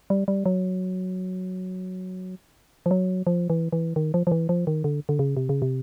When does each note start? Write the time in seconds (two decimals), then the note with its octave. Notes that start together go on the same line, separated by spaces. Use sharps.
0.10 G3
0.28 G3
0.46 F#3
2.86 F3
2.91 F#3
3.27 F3
3.50 E3
3.73 E3
3.96 D#3
4.14 F3
4.27 F3
4.32 E3
4.49 F3
4.67 D#3
4.84 D3
5.09 D3
5.19 C#3
5.37 C3
5.49 C#3
5.62 C3